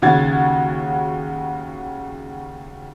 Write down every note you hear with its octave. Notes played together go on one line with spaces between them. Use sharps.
D#2 C#3 F#4 G#6 A6